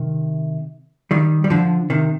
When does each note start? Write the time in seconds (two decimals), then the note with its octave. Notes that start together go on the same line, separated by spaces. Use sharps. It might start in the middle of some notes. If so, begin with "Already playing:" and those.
Already playing: C3 D#3
1.11 D#3 G3
1.44 G3
1.50 D3 F3
1.90 C3 D#3